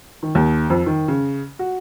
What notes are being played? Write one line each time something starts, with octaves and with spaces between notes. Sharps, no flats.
D#3
D#2
F2
D#3
C#3
F#4